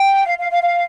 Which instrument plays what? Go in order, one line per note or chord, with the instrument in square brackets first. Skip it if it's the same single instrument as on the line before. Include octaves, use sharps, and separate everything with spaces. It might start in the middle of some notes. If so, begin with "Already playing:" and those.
Already playing: [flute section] G5
F5
F5
F5
F5